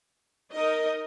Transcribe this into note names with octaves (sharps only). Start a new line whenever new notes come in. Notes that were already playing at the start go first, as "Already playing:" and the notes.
D#4 A#4 D#5